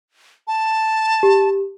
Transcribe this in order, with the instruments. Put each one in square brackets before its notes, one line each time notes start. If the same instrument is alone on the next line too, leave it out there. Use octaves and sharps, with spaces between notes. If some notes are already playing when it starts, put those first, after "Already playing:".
[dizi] A5
[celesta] G4